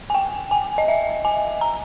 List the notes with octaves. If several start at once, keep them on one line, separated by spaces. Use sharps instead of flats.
G#5
G5
G#5
D#5
E5
G#5
A#5